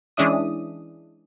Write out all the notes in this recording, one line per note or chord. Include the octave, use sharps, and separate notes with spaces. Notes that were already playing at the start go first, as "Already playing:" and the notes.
E3 G#3 C#4 D4 E5 D#6